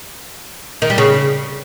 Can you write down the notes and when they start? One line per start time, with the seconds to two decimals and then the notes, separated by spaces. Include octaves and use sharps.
0.82 D#3
0.90 G3
0.98 C#3